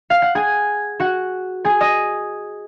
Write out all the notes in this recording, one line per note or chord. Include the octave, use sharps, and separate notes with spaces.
F5
F#5
G#4 G#5
F#4 F#5
G#4 G#5
D#5 D#6